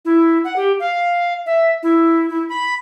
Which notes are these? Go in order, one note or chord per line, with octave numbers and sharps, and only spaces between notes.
E4
F#5
G4
F5
E5
E4
E4
B5